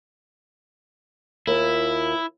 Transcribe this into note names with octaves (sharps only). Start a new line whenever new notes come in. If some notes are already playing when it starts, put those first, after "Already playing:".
D#2 E4 F4 A#4